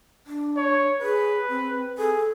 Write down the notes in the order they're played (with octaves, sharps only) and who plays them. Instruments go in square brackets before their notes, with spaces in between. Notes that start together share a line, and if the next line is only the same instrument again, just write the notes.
[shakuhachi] D4
[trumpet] C#5
[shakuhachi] G#4 [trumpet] B4
[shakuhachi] C4
[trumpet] G#4 [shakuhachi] A4